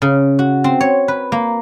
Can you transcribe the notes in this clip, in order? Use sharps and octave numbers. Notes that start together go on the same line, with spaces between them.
C#3
F#4
C4
C#5
B4
A#3